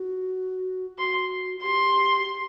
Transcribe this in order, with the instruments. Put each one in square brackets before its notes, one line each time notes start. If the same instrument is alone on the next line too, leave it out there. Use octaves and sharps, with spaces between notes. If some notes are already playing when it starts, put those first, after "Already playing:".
Already playing: [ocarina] F#4
[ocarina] F#4 [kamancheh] C6
[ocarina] G4 [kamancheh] C6
[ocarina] G4